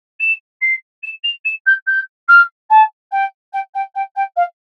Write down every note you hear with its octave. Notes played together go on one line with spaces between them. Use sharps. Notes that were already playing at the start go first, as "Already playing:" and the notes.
E7
C7
E7
F7
E7
G6
G6
F6
A5
G5
G5
G5
G5
G5
F5